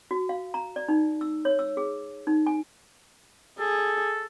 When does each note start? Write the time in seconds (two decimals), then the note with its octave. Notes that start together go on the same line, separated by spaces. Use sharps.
0.11 F#4
0.29 F5
0.54 A#5
0.76 D5
0.88 D#4
1.21 E6
1.45 C#5
1.59 E6
1.77 G#4
2.27 D#4
2.47 G#5
3.59 G#4 A4